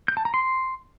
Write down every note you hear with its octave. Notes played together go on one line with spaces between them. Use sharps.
G6
A5
A#5
C6